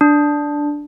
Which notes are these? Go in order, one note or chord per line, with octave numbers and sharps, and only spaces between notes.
D4